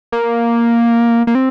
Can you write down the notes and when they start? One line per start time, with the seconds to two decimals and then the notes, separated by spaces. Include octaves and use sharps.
0.12 A#3
1.27 A#3
1.35 C4